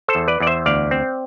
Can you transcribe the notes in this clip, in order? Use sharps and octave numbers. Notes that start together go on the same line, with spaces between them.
A4 C5
E2
B4 D5
E2 D5
C5 E5
D2 D5 F5
C4